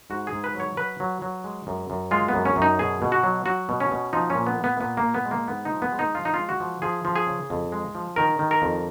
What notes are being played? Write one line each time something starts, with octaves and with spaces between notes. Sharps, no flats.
G#2 F#4
G#4
G#2
B4
F#3
C#5
F#3 B4
F#3
F#3
G#3
F#2
F#2
G#3 F4
B3
F#2
C#4
F#2
D#4
B2 G#4
B2
F#4
F#3
F#3 F#4
B2
C#4
B2
F3 D#4
C#4
A#2
B3
A#2
B3
A#2 B3
A#3
A#2
B3
G#3
A#3
G#2 B3
D#4
F3
B3
G#3
D#4
F3 F4
D#4
G#3 F4
F#4
F3
F3 G#4
F3
G#4
C#3
F2
G#3
F3
D#3 A#4
D#3
A#4
F2